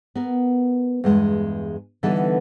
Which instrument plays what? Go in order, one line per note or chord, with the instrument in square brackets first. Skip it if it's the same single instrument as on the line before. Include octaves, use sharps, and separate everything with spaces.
[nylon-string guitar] B3 A#4
E2 G2 G#3
D3 E3 G3 B3 D#4 A4